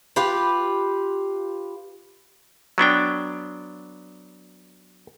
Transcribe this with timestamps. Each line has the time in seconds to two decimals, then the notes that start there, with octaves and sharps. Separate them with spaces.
0.16 F4 G4 B4
2.78 F#3 B3 D4 G5